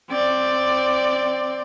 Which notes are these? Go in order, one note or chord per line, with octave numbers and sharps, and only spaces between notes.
C4 D5